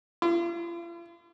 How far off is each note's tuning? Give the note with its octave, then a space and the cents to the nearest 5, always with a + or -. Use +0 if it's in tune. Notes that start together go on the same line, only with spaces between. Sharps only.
F4 -45